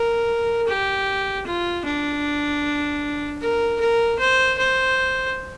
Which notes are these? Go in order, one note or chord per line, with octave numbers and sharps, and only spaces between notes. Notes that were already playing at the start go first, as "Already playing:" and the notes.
Already playing: A#4
G4
F4
D4
A#4
A#4
C5
C5